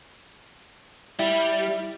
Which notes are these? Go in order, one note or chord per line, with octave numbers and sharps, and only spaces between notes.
G3 E4